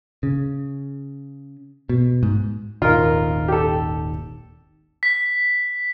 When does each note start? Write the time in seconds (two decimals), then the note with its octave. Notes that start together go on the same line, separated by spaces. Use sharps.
0.23 C#3
1.89 B2
2.23 G#2
2.82 D#1 G#1 D#3 F4 A#4
3.48 G4 A4
5.03 B6